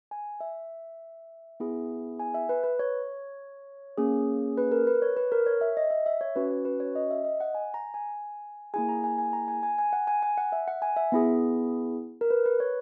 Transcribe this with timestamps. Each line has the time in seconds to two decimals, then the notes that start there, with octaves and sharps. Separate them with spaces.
0.11 G#5
0.41 E5
1.60 B3 E4 G#4
2.20 G#5
2.34 E5
2.49 B4
2.64 B4
2.79 C#5
3.98 A#3 C#4 G#4
4.58 B4
4.72 A#4
4.87 B4
5.02 C#5
5.17 B4
5.32 A#4
5.46 C#5
5.61 E5
5.77 D#5
5.91 E5
6.06 E5
6.21 C#5
6.36 C#4 F#4 B4
6.51 B4
6.65 B4
6.80 C#5
6.95 D#5
7.11 E5
7.25 D#5
7.40 F#5
7.55 G#5
7.74 A#5
7.94 G#5
8.74 A#3 E4 G#4 G#5
8.89 A#5
9.04 G#5
9.18 G#5
9.33 A#5
9.48 G#5
9.63 G#5
9.78 G#5
9.93 F#5
10.07 G#5
10.23 G#5
10.38 F#5
10.52 E5
10.68 F#5
10.82 G#5
10.96 E5
11.12 B3 E4 G#4
12.21 A#4
12.31 B4
12.46 B4
12.60 C#5